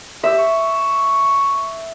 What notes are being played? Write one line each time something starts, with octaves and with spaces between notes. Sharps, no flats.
G4 E5
C#6